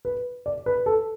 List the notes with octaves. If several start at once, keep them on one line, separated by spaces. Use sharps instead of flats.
B4
D5
B4
A4